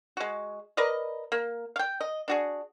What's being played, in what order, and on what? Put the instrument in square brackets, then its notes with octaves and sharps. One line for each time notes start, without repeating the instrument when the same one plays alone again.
[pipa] G#3 F#4
A#4 B4 D5 D#5
A#3
F5 G5
D#5
D4 F#4 G#4